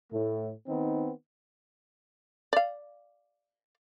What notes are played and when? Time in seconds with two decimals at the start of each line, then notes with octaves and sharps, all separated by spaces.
0.12 A2 A3
0.67 D#3 B3 C4 D#4
2.53 D5 F5